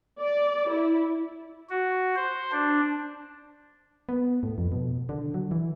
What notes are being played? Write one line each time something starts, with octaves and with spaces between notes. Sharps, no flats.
D5
E4
F#4
C5
D4
B3
A2
F2
B2
D3
F#3
E3